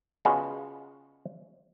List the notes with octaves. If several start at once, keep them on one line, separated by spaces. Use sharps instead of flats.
C#3 G#3 B3 C#4 F4 F#4